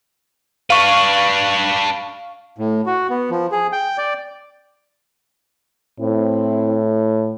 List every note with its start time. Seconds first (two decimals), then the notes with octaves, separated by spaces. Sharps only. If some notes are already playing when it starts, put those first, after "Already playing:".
0.70 D4 B4 F5 C#6
2.58 A2
2.86 F#4
3.10 B3
3.31 F3
3.52 G#4
3.73 G5
3.98 D5
6.00 A2 C4 E4